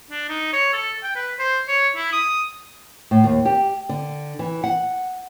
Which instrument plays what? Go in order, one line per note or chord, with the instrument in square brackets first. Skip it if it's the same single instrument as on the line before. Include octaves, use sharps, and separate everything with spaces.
[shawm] D4
D#4
C#5
A4
G5
B4
C5
C#5
E4
D#6
[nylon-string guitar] A2
D#2
G4
D3
E3
F#5